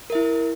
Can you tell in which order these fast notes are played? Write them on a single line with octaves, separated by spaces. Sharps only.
A#4 E5 E4